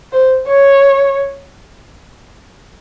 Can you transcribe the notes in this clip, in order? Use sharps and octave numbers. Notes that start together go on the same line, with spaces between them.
C5
C#5